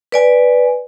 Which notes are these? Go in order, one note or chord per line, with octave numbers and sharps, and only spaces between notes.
B4 D5 G#5